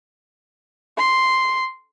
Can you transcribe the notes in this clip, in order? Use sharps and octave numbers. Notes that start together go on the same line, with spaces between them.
C6